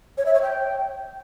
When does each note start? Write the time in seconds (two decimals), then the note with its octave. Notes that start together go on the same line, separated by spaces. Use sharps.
0.18 C#5
0.26 E5
0.34 C#5
0.42 G5